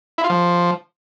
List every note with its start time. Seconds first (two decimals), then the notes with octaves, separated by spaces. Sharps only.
0.18 E4
0.24 F4
0.30 F3